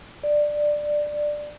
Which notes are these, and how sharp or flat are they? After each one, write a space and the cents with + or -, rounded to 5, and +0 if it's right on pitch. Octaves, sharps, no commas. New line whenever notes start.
D5 +10